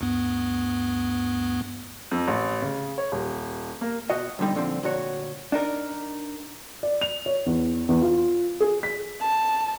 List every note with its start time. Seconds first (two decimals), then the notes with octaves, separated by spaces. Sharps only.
0.01 D2 G2 B3
2.11 F2
2.28 A1
2.62 C#3
2.98 C#5
3.12 D#1
3.81 A#3
4.10 B2 F#4 D#5
4.39 B1 F2 D3 G3 D#4
4.55 A#2 D3 F3 C4
4.83 D2 A#2 F#4 C#5
5.52 D4 D#4 A#4
6.83 D5
7.01 F7
7.26 C#5
7.46 E2
7.89 E2
8.02 F4
8.61 G#4
8.83 B6
9.21 A5